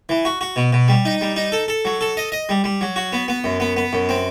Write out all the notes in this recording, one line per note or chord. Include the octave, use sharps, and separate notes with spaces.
E3
F#4
F#4
B2
B2
G3
D#4
G3
D#4
A4
A4
F#3
A4
D#5
D#5
G3
G3
F#3
F#4
B3
B3
F#2
B3
B3
F#2
C4